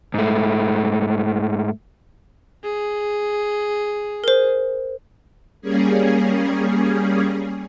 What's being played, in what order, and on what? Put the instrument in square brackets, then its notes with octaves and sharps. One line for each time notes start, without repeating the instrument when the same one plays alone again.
[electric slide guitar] G#2 A3
[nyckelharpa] G#4
[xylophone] A#4 C5
[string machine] G3 A#3 C#4 G#4